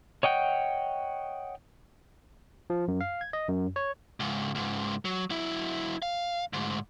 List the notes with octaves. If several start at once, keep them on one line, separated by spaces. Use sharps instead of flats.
C#5 D#5 F#5 G5
F3
F#2
F5
G#6
D#5
F#2
C#5
C#2 G#2
C#2 G#2
F#3
F#3 E4
F5
D2 G#2